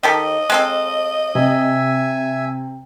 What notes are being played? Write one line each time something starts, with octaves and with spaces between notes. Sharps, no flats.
D#3 G4 A4 D#5
G#3 C4 A4
C3 E5 G#5